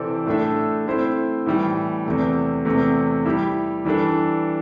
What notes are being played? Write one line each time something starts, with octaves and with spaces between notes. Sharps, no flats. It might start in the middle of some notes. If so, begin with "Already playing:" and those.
Already playing: C3 E3 C4 A4 D5
A2 A3 D4 A4 E5
A3 C4 E4 C5
A2 E3 G3
E2 C3 A3
E2 C3 A3
G3 E4 G4
E3 G3 D4 A4